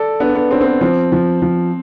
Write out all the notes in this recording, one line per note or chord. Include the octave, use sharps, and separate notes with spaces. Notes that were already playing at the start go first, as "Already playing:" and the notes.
Already playing: A4 D5
B3 D4
B3
C4 D4
C4
B3
F3 C4
F3
F3